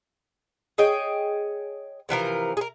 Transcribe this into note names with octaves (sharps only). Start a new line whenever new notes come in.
G#4 C#5 D#5 G5
C3 E3 F3 A#4
G#4 A#4